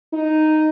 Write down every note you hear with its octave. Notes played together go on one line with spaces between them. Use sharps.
D#4